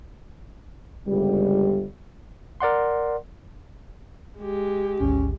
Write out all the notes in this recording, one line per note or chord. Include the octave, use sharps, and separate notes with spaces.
G1 C#2 G3
A#4 D5 F#5 C6
G#3 G4
G#1 D2 C#4